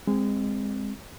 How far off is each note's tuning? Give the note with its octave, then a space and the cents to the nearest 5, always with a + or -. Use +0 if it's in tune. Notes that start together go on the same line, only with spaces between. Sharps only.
G#3 -25 C4 +0